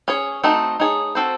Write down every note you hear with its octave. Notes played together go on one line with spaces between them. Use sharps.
C#4 G#4 C#5
A3 C4 D#4 F#4 A4
A3 D#4 G#4 C#5
C4 F#4 A4 C5